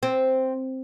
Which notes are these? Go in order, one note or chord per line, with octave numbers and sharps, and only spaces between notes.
C4